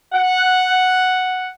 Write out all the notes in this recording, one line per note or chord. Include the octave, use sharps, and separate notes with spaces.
F#5